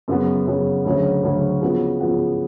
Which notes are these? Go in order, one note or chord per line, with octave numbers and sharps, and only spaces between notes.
F#2 C#3 F#3 B3
F#2 C#3 F#3 B3
D2 C#3 F#3 C#4
D2 C#3 F#3 C#4
C#3 F3 B3 F#4
C#3 F3 B3 F#4